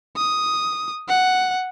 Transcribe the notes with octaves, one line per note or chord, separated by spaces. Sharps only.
D#6
F#5